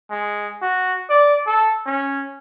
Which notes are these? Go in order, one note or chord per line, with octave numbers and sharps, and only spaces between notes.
G#3
F#4
D5
A4
C#4